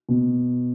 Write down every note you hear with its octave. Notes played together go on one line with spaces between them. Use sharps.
B2